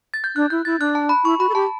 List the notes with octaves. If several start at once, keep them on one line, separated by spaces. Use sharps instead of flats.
A6
G6
D4 F#6
E4 G6
E4 A6
D4 F#6
A5
B5
E4 C#6
F#4 B5
A4
G4 A5